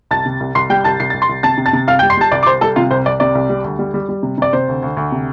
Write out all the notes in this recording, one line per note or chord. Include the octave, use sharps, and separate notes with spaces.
C2 A5 A6
C3
C2
C2 C6 C7
G3 G5 G6
C2 A5 A6
C2 C7
C2 A6
C6 C7
C2
C3 A5 A6
C3
A5 A6
C3
C2 F5 F6
G5 G6
G3
C6 C7
G3 A5 A6
C2 D5 D6
D6
C2 C5 C6
G3 A4 A5
C3 F4 F5
C2 C5
C2 D5
C3 D5
C2
G3
D2
G3
G3
G3
C3
C3 D5
C3 C5
D2
D2
D2
C3